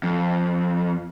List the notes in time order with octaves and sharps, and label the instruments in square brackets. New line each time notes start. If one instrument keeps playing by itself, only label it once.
[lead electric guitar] F2